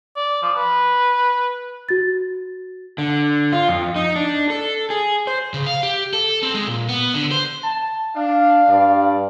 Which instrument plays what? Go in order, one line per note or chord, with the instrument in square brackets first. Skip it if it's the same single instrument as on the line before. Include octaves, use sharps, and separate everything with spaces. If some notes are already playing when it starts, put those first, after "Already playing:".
[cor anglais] D5
F3
B4
[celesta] F#4 A6
[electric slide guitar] D3
F4
F2
D#4
D4
A4
G#4
C5
[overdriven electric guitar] C#3
F5
G4
A4
C4
G#3
A#2
B3
D3
C5
[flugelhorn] A5
[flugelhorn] D4 [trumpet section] F5
[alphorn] G2 [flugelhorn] D5